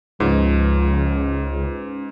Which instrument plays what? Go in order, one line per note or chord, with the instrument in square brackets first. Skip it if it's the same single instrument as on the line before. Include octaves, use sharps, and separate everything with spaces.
[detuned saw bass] C#2 [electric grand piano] G#2 [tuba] F3 [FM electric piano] C#4 F4 B4